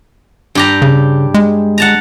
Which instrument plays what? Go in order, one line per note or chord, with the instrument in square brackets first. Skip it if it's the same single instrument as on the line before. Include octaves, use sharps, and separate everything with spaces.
[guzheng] G2 G4 A#5
[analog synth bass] C#3
G#3
[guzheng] F#5 A5 A#5